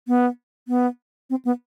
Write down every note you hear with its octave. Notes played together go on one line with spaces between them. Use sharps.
B3
B3
C4
B3